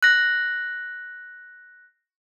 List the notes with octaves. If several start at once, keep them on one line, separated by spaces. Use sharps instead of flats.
F#6 A#6